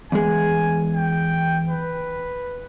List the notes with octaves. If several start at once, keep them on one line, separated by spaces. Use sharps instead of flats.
E2 G#3 G#5
G5
B4